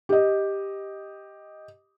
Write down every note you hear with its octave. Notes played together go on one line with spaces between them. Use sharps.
G4 D#5